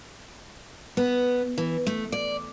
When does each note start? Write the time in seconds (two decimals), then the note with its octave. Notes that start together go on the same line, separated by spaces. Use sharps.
0.97 B3
1.58 E3
1.87 A3
2.12 D5